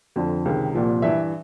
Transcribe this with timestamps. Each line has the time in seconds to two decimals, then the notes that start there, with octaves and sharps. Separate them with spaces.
0.16 F2 D3 F3
0.45 C#2 C3 D#3
0.74 C2 A#2 F3
1.02 G2 E3 E5